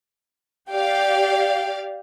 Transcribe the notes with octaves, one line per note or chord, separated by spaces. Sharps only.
G4 D5 F5 G5